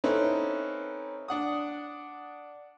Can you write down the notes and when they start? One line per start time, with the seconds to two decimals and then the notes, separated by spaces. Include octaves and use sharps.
0.04 C4 C#4 D#4 E4 A4 B4
1.28 D4 F#5 D#6